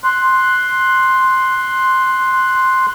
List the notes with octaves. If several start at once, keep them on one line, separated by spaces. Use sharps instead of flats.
C6 F#6